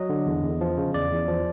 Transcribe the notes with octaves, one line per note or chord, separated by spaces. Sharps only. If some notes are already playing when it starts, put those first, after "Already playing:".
Already playing: F#3 D#5
D3
E2
E2
F3
C#3
E2 D5
E2
F3